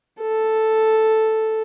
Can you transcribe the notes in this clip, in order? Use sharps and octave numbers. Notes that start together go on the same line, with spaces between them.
A4